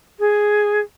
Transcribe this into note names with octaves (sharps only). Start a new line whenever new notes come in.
G#4